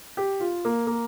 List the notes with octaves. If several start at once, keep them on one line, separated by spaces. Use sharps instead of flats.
G4
F4
A#3
A#3